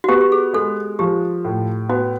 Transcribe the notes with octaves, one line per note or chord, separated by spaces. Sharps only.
F#4
B3 G4
G4
G#4
G#3 A4
F3 G4
A2
B3 F#4